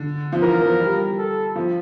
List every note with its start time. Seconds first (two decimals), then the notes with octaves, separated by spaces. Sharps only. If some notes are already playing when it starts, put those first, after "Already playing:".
Already playing: D3
0.32 F3
0.42 E3 A#4
0.61 F3
0.79 G3
1.18 A4
1.56 F3